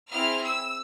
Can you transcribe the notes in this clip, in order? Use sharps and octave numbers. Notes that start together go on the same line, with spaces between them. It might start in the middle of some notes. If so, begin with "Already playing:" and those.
C4 E4 G#4 F6
E6